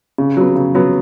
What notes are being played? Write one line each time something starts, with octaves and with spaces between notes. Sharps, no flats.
C#3
F#3 B3
C#3
F#3 B3